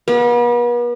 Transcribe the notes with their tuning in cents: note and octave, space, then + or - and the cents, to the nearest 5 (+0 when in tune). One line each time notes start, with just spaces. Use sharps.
B3 -40